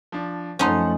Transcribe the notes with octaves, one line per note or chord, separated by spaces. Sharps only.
F3 D4
F#2 F3 A3 C#4 D#4 F#5 A5 C6